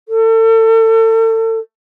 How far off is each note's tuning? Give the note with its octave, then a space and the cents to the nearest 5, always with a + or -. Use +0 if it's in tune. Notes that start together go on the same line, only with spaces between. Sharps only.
A4 +35